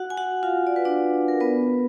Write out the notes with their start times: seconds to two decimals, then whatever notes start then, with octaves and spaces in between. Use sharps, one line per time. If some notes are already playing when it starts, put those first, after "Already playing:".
Already playing: F#4 F#5
0.10 G#5
0.17 F#4 F#5
0.43 F4 F5
0.67 D5
0.76 B4
0.85 D4 D5
1.28 A#4
1.40 B3 B4